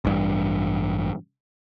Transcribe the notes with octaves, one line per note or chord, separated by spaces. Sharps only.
A1 G2